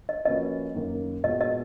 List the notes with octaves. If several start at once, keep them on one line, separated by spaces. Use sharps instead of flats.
D#5
F3 A#3 C#4 F#4 B4 D#5
F#2 D#3 A#3 D#4
A#2 G#3 B3 F#4 D#5
D#5